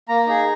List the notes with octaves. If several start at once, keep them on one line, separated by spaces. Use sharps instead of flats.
A#3 A#5
D#4 G#4